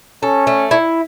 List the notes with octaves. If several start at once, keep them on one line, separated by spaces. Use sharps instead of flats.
C#4 A4
A3
E4